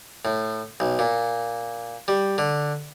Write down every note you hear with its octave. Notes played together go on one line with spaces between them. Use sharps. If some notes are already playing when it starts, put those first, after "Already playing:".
A2
B1
A#2
G3
D3